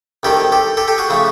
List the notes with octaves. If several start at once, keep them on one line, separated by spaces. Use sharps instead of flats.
C2 C3 D#3 G#3 G4 A4
G4 A4
G4 A4
G4 A4
F#4 G#4
C#3 F3 A3